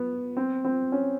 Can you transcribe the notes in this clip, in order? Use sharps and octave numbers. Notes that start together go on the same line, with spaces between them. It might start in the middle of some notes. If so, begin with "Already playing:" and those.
Already playing: B3
C4
C4
C#4